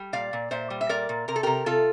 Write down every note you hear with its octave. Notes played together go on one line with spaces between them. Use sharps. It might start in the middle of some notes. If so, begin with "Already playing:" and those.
Already playing: G3
A#2 D5 F5
A#2
A#2 C5 E5
G3
E5
A#2 A#4 D5
A#2
C3 A#4
A4
C3 G4 A#4
C3 F4 A4